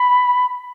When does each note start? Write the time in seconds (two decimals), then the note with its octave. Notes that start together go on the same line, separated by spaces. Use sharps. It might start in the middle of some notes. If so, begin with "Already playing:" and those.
Already playing: B5